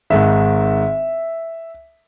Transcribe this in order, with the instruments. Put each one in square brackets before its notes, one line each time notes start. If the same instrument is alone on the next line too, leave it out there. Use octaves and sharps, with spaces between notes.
[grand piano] G#1 G#2 D#3 E5